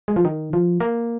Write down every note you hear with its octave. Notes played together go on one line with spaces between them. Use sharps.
G#3
F3
D#3
F3
A#3